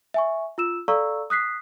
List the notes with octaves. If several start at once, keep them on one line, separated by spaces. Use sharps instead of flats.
E5 G#5 C#6
F4 E6 E7
A4 D5 F5 A#5 C#6 E6
D#6 F#6 B6 C7